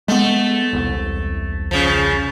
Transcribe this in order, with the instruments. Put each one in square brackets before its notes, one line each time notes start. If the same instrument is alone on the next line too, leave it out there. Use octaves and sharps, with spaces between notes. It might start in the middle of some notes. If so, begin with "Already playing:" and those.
[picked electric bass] G#3 B3 [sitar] A3
[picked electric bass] E1 C2
[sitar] C#3 F3